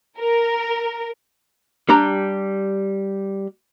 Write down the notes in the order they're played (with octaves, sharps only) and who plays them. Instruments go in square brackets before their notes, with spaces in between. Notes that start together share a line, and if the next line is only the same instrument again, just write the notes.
[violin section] A#4
[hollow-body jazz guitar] G3 D4 G4 A#5